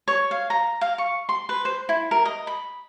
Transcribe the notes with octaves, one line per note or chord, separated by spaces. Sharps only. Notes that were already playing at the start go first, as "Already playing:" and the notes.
C#5
F5
A#5
F5
C#6
C6
B4
C5
E4
A#4
D#5
B5